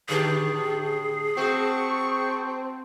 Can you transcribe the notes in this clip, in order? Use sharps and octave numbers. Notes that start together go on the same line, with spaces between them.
A2 D3 G4 G#4
A3 C4 F#4 C#6